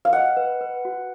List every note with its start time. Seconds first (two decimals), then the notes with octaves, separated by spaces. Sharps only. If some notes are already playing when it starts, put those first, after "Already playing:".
0.05 F5
0.13 D#5 F#5
0.37 B4
0.61 B4
0.85 F#4